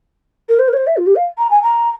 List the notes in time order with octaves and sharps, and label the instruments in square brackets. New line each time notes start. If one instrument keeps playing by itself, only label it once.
[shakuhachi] A#4
C5
A#4
C#5
C5
E5
F4
G4
F5
A#5
G#5
A#5